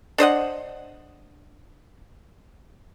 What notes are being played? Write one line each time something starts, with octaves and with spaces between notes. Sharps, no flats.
D4 C5 D#5 F#5